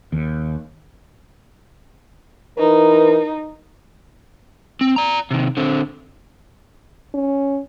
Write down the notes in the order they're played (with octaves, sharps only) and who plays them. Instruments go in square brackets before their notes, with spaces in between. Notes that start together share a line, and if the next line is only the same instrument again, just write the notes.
[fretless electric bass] D#2
[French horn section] E3 A#4 B4 [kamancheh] D#4
[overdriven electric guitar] C4
D5 A#5
C3 D#3
D3 C4
[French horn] C#4